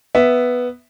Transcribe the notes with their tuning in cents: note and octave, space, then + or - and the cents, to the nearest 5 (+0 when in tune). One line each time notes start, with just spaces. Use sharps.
B3 +0 E5 +0